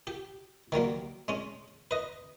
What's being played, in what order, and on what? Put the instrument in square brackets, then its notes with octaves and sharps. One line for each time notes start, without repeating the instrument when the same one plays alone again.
[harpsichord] G4
D#3 F#3 G3 A#3
G#3 C#4
B4 D#5